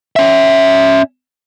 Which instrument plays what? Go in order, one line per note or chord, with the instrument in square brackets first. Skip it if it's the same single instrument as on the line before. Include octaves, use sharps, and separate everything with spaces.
[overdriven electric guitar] C#4 E5